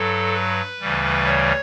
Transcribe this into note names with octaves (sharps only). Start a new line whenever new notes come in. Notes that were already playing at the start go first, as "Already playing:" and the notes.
Already playing: G2 F#3 A4
B4
D2 C#3 E3 G3
C#5